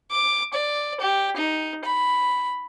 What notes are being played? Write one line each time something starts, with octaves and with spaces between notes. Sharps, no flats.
D6
D5
G4
D#4
B5